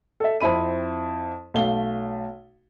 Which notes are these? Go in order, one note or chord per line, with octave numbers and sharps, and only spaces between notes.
A4 E5
F2 C4 E4 B5 D#7
B1 A3 F5 G7